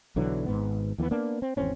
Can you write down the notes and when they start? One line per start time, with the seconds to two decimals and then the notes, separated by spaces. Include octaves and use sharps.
0.16 B1 D3 E3 F#3
0.46 G#1 G#2 B3
0.98 D#2 E3 A3 B3
1.11 A#3 B3 D4
1.42 C4
1.57 G#1 E2 C4 C#4